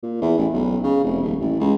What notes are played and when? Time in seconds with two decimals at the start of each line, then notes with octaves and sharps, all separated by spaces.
0.03 A#2
0.22 E2
0.38 A1
0.53 B1
0.83 C#3
1.04 F1
1.23 D#1
1.40 A1
1.60 C#2